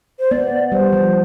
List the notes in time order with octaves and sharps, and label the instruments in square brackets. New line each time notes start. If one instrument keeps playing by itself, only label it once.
[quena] C5
[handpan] B3 [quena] D5
[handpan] G3 [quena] C5
[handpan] F3